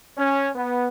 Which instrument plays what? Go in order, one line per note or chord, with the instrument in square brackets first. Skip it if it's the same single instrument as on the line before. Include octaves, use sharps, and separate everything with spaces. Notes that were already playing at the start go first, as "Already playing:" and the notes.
[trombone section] C#4
B3